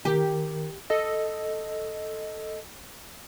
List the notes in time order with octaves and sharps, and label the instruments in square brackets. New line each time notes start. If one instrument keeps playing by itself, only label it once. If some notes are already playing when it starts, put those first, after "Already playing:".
[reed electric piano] D#3 A#4 [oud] G4
[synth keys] A4 D#5